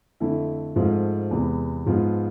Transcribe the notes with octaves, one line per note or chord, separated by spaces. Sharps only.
F2 D3 A3 E4
G#2 F3 A3 C4 F4
E2 C3 G#3 B3
G#2 F3 B3 F4